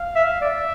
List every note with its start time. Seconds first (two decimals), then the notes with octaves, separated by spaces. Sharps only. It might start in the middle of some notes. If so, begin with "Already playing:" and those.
Already playing: F5
0.15 E5
0.41 D5 E5